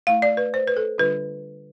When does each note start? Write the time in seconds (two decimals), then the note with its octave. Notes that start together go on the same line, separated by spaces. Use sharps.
0.07 A3 E4 F5
0.22 D5
0.37 B4
0.54 C5
0.68 B4
0.77 A4
0.98 D3 G3 D4 F4 B4